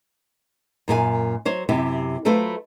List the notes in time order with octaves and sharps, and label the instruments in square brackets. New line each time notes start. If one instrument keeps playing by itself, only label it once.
[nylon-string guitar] F#2 A#2 F#4 G#5
F#3 C5 C#5
F#2 C3 E4 G4
F#3 A3 F4 A4 B4 C5